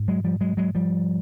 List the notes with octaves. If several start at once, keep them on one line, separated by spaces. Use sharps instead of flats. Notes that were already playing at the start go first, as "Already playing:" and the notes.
Already playing: G#2
F#3 G#3
F3 G3
F#3 G#3
F#3 G#3
F3 G3